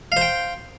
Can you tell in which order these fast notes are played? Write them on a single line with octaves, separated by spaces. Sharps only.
F5 C5 G5